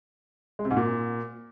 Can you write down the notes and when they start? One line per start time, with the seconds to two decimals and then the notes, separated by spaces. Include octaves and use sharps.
0.59 G#3
0.65 C3
0.71 G#2
0.77 A#2